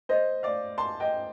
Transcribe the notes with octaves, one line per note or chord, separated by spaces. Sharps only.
C5 D#5
D5 F5
A5 C6
D#5 G5